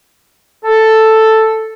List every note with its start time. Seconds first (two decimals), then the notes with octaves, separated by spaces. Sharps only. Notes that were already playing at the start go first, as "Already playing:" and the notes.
0.64 A4